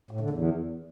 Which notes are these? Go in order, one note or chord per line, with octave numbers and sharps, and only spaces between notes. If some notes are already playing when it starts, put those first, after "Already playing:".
A2
D3
E2